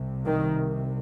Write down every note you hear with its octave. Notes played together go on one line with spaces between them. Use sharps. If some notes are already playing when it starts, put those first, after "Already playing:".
Already playing: C2 C3
D#3